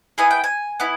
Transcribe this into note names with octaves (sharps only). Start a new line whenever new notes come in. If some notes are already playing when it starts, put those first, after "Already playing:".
B3 E4 G#4 G#5
G5
G#5
B3 E4